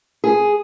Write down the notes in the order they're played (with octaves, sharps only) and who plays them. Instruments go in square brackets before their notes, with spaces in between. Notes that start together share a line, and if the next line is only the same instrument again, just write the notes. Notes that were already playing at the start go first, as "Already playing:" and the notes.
[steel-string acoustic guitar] G#4